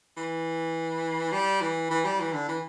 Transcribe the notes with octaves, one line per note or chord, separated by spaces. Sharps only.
E3
G3
E3
E3
G3
E3
D3
E3